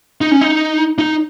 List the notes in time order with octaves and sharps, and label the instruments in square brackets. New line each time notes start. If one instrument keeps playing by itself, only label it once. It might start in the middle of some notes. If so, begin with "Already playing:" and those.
[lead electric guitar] D#4
C#4
D#4
D#4